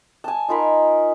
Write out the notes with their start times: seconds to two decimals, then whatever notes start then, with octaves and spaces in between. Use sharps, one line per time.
0.24 G#5 A5
0.48 D#4 F4 A#4 B5